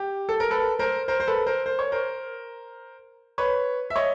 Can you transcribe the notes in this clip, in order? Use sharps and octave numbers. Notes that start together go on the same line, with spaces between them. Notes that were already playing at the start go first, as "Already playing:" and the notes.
Already playing: G4
A4
A#4
A4 B4
A#4 C5
A#4 C5
C5
A4 B4
A#4 C5
C5
C#5
A#4 C5
B4 C#5
E5
C#5 D#5